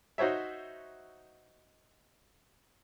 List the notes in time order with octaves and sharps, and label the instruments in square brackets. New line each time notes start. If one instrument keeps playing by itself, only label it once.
[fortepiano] D#4 F#4 C5 C#5 E5